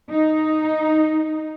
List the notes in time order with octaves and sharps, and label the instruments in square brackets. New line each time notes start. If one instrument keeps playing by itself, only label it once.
[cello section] D#4